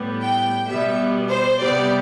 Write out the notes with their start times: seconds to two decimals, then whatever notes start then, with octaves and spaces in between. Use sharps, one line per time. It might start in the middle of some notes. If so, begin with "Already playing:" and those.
Already playing: A2 G3 B3
0.21 G5
0.67 B2 G3 B3 E5
1.30 C5
1.61 C3 G3 B3 D5